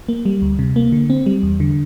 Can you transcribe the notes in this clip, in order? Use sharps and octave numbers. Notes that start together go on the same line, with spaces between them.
A#3
G3
D2
C3
A#3
D3
C4
G3
E2
D3